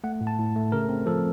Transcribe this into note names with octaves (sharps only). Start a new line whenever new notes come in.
A3 F#5
A2
A5
A2
A3
C#3 A#4
C4
F3 A4